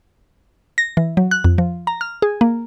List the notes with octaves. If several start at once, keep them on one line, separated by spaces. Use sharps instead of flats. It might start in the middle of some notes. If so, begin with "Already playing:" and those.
A#6
E3
F#3
F#6
F2
F3
A#5
F6
G#4
A#3